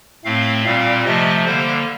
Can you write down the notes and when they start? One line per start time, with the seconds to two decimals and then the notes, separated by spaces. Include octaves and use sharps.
0.25 A2 A3 C4 F5
0.65 A#2 G3 C4 F5
1.05 C3 F3 A3 D#5
1.45 D3 G3 A#3 C5